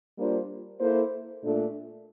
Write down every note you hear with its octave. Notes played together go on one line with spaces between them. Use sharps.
G3 A#3 D4 F4 C5
A#3 E4 A4 C5
A#2 A3 D4 A4